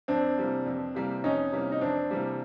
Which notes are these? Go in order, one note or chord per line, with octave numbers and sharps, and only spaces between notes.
F2 C4 D4
C3 E3 G3 A#3
F2
C3 E3 G3 A#3
F2 C#4 D#4
C3 E3 G3 A#3
D#4
F2 C4 D4
C3 E3 G3 A#3